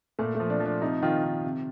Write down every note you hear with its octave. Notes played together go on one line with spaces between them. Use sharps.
A#2 A3
A3
F3
D4
F3
D4
C3 D#4
D#3 F4
D#3
C3